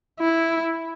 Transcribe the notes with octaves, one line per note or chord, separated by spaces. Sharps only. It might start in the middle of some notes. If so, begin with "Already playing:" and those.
E4